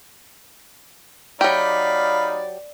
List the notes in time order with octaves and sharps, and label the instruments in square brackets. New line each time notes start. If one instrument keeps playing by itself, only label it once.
[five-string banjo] F#3 G4 [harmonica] D#4 F5 B5 [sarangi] D5